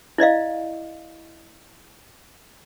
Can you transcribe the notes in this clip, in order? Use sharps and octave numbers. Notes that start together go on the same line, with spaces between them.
E4 D5 D#5 F5